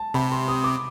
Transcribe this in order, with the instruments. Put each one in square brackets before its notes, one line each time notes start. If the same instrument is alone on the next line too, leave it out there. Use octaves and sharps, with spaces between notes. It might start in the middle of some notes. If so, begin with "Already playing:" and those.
Already playing: [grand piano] A5
[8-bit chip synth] C3 [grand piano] B5
[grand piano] C6
D#6
D6